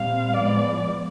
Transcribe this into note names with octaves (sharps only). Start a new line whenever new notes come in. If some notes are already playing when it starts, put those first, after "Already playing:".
Already playing: A#2 G3 C4 F5
A2 F3 G#3 B3 D5